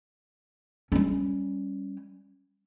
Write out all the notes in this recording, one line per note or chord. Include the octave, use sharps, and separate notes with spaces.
G3 C#4